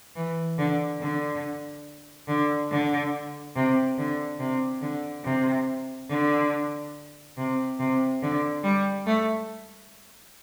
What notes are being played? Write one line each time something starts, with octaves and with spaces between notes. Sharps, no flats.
E3
D3
D3
D3
D3
C3
D3
C3
D3
C3
D3
C3
C3
D3
G3
A3